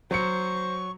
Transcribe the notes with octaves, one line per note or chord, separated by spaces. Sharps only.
F#3 C5 C#6 C#7